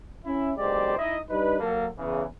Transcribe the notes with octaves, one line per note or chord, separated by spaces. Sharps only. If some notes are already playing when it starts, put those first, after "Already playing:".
C#4 E4
F#1 B1 G#3 G4 C5 D5
D#4 E4 D#5
G3 D4 D#4 B4
F#3 A#3 A4
E2 C#3 E3